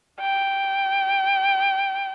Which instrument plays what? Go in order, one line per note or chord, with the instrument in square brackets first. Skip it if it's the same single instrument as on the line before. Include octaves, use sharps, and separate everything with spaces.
[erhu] G5